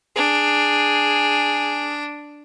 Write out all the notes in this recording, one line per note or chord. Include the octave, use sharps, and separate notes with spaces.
D4 G#4